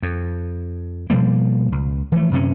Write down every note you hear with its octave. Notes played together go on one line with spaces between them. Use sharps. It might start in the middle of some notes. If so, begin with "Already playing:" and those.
F2
B2 F3 G3 A#3
C#2
E3 F3 A3
F#2 C3 C#4